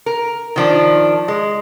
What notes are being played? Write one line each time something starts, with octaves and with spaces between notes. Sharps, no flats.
A#4
D#3 F3 D4
G#3